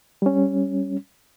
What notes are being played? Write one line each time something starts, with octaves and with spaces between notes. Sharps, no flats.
G3 C#4